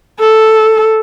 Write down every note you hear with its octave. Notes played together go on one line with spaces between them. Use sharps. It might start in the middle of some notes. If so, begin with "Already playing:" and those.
A4